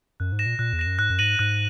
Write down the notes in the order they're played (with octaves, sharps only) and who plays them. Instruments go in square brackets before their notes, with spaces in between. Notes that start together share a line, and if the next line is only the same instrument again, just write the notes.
[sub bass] F#2 [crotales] F#6
[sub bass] G#2
[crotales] A#6 E7
[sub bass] A#2
[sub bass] A#2 [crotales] F#6
[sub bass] E2
[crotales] A#6 E7
[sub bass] F#2
[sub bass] G#2 [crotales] F#6
[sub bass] F#2
[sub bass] G#2 [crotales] A#6 D#7 F#7
[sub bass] G#2 [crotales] F#6